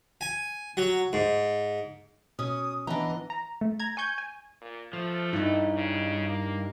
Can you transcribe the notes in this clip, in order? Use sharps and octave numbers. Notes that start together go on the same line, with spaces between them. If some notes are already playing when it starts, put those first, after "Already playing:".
G#5
F#3
G#2
B2 C#4 D#6
E3 B3 D4 D#5 A#5
A#5
A3
A#5 G#6
G#5 C#6 G6 G#6
G#5
A#2
F3 A3
G2 D#4 E4
C#3
A#3